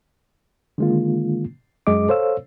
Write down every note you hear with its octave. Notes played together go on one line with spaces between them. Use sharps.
D3 D#3 G#3 A#3 F4
F#2 G#3 G#4 D#5 D6
A4 C5 C#5 F5 E6